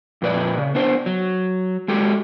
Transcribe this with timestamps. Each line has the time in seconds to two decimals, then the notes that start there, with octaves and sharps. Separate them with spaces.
0.22 F2 A#2 B4 D5
0.58 C#3
0.75 B3 D4 C5
1.06 F#3
1.88 G#3 F#4 G4 A4